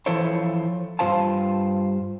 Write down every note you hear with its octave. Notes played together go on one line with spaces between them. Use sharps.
E3 F3 E4 A4 C5 C#5
G2 G3 F4 C5 F5 A5